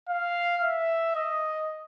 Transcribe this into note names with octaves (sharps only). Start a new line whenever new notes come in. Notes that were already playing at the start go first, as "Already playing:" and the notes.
F5
E5
D#5